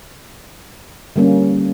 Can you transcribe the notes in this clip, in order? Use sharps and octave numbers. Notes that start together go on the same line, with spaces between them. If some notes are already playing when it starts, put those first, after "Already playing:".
D3 G3 A#3 C#4